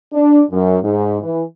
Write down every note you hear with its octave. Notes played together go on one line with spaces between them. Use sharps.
D4
F#2
G#2
E3